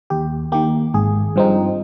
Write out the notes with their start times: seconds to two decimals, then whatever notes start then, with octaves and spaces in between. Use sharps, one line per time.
0.10 D#2 G4
0.52 D#3 A#3 G4
0.94 G#1 G#4
1.36 G2 F3 C4 D#4